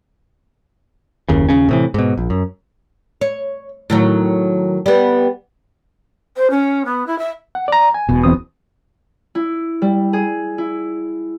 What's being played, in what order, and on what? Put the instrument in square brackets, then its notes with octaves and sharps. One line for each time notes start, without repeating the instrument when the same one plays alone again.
[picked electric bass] F#1 D#2 C#3
D#1 G#1 C#3 C#4
A2 C3 E3
G#2 B2
A#1
F#2
[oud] C#5
A2 D#3 F#3
G3 B3
[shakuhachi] C5
C#4
B3
E4
E5
[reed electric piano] F#5
D5 A#5
G#5
[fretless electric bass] E1 B2
[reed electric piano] E2 C4 D#6
[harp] E4
G3
G#4
E4